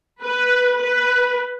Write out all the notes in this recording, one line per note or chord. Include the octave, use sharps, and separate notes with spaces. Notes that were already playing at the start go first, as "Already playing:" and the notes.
B4
B4